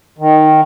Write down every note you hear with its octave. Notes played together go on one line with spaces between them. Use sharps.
D#3